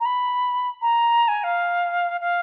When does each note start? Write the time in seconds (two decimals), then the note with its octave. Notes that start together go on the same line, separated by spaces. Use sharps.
0.01 A#5
0.05 B5
0.82 A#5
1.28 G#5
1.44 F5
2.21 F5